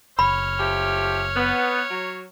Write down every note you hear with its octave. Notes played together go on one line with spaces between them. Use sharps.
F#1 C#5 B5 F6
F3 A3 G4
B3
F#3